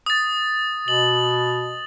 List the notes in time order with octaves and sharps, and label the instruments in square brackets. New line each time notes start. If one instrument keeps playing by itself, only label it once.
[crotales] D#6 A6
[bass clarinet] B2 [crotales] F#7